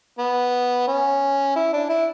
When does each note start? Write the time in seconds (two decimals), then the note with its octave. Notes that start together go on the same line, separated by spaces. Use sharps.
0.19 B3
0.88 C#4
1.56 E4
1.73 D4
1.89 E4